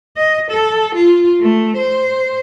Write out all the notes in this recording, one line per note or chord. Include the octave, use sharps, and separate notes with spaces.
D#5
A4
F4
A3
C5